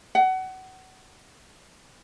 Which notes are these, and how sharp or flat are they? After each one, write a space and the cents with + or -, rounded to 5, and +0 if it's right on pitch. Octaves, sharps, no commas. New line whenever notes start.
F#5 +25